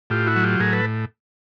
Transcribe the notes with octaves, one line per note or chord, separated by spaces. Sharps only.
A2 F4 G4
E4 F#4
F#3
F4 G4
A2 G#4 A#4
A4 B4